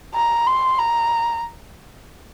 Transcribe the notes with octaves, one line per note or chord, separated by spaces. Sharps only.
A#5
C6
A#5